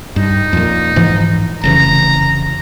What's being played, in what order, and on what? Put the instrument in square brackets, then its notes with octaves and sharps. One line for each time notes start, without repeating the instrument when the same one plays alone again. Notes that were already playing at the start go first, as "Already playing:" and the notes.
[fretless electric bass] G2 [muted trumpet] D#4
[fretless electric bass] F2 A#2
G#2 E3 F3
[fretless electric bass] F1 C#3 E3 [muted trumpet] A#5